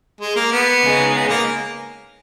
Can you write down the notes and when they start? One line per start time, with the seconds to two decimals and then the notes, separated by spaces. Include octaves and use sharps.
0.21 G#3
0.36 A#3
0.52 B3
0.82 C#3 G#3 D#4
1.14 B3
1.29 A#3